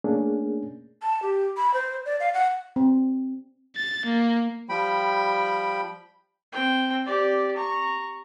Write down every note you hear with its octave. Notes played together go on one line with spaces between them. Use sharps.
A3 A#3 C#4 D4 G#4
A5
G4
B5
C5
D5
F5
F#5
C4
A6
A#3
F3 G3 G5 B5
C4 G5
G4 D5
A#5 C#6